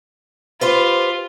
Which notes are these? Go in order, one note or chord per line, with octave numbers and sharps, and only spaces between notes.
F4 G4 B4 C5